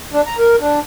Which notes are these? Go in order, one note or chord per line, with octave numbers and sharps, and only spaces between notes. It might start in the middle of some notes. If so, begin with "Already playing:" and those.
D4
A#5
A#4
D4